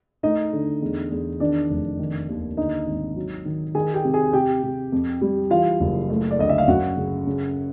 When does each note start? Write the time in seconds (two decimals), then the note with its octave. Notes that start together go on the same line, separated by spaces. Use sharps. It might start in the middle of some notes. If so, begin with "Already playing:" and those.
0.23 A3 D#4 D#5
0.53 D3
0.82 E2
1.11 E2
1.40 D#3 D4 D5
1.70 F1
1.99 D#3
2.29 D#2
2.57 D3 D#4 D#5
2.87 G#1
3.16 F#3
3.45 D#3
3.75 D#3 G#4 G#5
3.94 G4 G5
4.04 C3
4.14 G#4 G#5
4.33 C3 G4 G5
4.63 C3
4.92 F2
5.21 G3
5.50 E3 F4 F5
5.80 F#1
6.10 A3
6.31 D5
6.39 D2 D#5
6.49 E5
6.58 F5
6.68 F#2 F#4 F#5
6.97 C#3
7.27 C#3